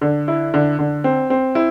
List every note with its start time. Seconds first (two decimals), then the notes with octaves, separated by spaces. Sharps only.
0.01 D3
0.28 E4
0.54 D3
0.79 D3
1.04 C4
1.30 C4
1.55 E4